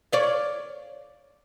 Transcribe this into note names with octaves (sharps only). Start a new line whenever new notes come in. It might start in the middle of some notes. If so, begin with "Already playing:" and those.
C#5 D5 F5